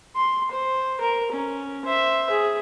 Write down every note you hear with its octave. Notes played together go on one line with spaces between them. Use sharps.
C6
C5
A#4
C#4
C5 E5
G#4